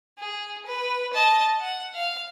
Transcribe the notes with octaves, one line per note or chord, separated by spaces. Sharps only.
G#4
B4
D#5 A5
F#5
F5